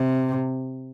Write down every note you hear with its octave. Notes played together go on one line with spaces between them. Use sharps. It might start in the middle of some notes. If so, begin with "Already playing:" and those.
Already playing: C3